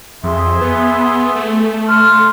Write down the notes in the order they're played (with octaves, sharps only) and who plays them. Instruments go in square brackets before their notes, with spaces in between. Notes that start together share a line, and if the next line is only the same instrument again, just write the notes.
[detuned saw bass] F2 [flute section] G#4 E5 C6
[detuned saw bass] B3
A3
[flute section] C6 F6